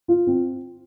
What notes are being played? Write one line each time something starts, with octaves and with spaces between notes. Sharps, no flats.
F4
C4